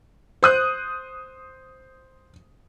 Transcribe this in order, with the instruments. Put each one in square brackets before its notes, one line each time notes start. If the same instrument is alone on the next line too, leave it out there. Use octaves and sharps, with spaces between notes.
[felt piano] C5 D#6 F#6